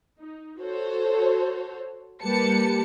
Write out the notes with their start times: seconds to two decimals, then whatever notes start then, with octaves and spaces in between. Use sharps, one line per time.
0.19 D#4
0.61 F#4 A4 C5 C#5
2.23 G3 A#3 G4 B4 A5 C#7